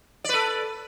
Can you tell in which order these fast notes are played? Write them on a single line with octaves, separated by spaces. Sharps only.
D5 B4 A4